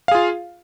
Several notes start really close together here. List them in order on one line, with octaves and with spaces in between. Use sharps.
F5 G#4 F4